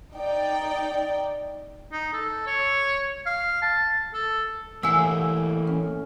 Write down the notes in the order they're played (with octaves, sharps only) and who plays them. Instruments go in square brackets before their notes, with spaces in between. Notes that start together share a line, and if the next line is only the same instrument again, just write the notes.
[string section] D#4 D5 G5
[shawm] D#4
A4
C#5
F5
A5
A4
[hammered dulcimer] A2 [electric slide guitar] E3 A#3 [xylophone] F#5 G#5 C7 [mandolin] E6
[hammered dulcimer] C#4